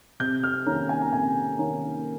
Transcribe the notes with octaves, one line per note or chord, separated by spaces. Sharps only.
C3 G6
F6
D#3 A#3 C#4 A#5
G#5
A#5
C3 G#5
D#3 A#3 C#4 A#5